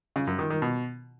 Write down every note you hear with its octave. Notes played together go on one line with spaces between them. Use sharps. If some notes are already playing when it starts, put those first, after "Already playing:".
C#3
F#2
D#3
D#3
B2